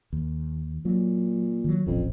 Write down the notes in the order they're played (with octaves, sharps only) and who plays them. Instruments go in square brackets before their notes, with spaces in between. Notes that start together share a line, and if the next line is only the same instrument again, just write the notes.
[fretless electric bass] D#2
[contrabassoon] A#2 [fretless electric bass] F#3
[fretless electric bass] D#3 E3 F#3
[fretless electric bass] D#1 A1 C#4 [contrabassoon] F2